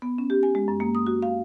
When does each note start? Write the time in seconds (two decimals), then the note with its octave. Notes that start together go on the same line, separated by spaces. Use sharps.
0.02 B3
0.18 C#4
0.30 G4
0.43 G#5
0.55 G#3
0.68 F#2
0.80 A#3
0.95 D#6
1.07 F#4
1.22 F5